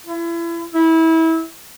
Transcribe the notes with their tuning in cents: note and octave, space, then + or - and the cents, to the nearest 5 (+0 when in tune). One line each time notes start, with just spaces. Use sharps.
E4 +35
E4 -25